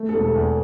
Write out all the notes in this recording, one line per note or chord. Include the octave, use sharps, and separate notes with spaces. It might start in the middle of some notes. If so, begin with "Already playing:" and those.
Already playing: A3
A4
E1
A4
E2